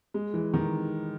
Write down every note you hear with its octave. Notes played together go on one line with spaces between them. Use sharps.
G#3
E3
D#3